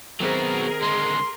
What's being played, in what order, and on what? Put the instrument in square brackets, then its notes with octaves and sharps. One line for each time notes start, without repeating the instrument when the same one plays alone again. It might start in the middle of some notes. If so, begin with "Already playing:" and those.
[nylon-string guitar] D#3 C4 E5 [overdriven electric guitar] F#3 B3 [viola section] G#4 A#4
[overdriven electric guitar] D3 G#3 [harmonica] C6